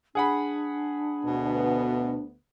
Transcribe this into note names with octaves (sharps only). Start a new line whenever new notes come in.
D4 G#4 F#5 B5
D2 B2 B3